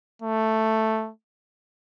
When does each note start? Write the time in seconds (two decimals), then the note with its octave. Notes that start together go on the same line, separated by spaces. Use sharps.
0.22 A3